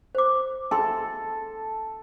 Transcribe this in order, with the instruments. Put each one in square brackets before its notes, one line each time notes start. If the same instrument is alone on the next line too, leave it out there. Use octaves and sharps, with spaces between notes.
[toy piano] C5 D6
[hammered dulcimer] A4 [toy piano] G#5 C6 E6